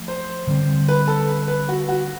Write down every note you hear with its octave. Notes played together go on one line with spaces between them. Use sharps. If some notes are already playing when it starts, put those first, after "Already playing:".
Already playing: F3 A3
C5
D3 G3 C4
B4
A4
B4
B4
F#4
F#4